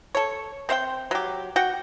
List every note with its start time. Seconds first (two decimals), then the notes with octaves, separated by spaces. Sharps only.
0.15 A4 C#5
0.69 C4 C5 F5 G5
1.11 F#3 G4
1.56 F#4 F#5 G5